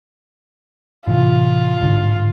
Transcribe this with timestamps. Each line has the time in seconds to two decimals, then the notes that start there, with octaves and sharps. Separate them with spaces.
1.07 A2 C3 E3 F4
1.81 A1 G#2 D3